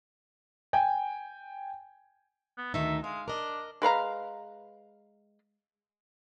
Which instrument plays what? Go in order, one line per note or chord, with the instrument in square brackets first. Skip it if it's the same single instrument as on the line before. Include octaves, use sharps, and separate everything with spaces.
[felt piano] G5 G#5
[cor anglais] B3
[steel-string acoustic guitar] D2 D#3 D#4 [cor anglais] E5
[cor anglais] G#3 [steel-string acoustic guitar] F5
[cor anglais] D4 [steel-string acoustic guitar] A#4 D#5
[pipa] G#3 B4 F5 A#5